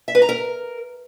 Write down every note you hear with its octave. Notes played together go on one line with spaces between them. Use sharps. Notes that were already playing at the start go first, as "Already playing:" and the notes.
E5
B4
A#5
A#4